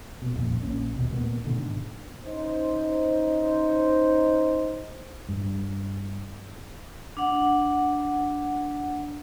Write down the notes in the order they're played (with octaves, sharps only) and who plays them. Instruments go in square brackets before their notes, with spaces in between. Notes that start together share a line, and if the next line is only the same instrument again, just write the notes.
[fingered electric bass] B2
D#1 F2 A#2
A#1 A#2 C#4
D#2 B2
A#2 A3 B3
G#2 B2 D3 D#3
[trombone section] C#4 D#4 C5
[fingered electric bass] G2
[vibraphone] D4 F#5